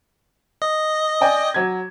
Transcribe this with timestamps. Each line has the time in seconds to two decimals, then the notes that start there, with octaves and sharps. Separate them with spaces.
0.62 D#5
1.21 D5 G5 G#5
1.54 F#3 G#6